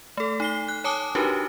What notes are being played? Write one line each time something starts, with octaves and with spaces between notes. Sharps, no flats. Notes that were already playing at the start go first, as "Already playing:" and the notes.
A3 A4
D#4 C7 G7
F#6
C#5 G#5 A5 D6 D#6
D4 D#4 F#4 G4 A#4 B4